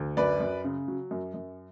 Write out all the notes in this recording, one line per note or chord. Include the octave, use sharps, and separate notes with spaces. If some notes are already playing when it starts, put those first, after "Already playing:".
Already playing: D2
F#2 B4 D5
F#2
C#3
F#3
F#2
F#2